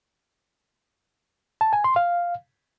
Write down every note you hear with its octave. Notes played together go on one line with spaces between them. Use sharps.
A5
G#5
C6
F5